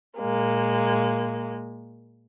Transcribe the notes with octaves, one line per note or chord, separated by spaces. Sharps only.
A#2 G#3 A#3